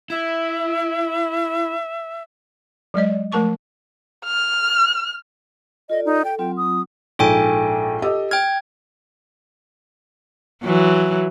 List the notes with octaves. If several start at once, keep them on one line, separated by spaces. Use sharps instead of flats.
E4 E5
F#3 G#3 D5 D#5
F3 A3 A#4 A5 C#6 D6
F6
F4 A4 D5 D#5
D#4
A4 G5
F#3 C4 F4 G5
D#6
A#1 G#2 A4 G5 G#5
G4 A4 D#5
G5 F6 G#6
E3 F#3